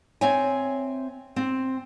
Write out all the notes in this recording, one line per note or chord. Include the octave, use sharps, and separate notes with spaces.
C4 C#5 E5 G#5
C4